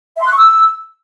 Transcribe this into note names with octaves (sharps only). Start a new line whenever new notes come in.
E5
C6
F#6
C#6
E6